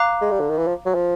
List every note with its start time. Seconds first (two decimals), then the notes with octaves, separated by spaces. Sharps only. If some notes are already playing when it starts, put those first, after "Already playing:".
Already playing: F5 A#5 D6 F#6
0.21 G#3
0.31 G3
0.40 D3
0.49 D#3
0.58 E3
0.67 F3
0.86 F#3
0.94 F3